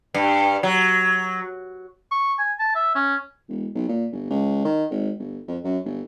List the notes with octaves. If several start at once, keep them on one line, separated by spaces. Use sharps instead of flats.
G2
F#3
C#6
G#5
A5
E5
C#4
E1
B1
A#2
G1
C#2
D#3
G#1
G1
F2
F#2
G1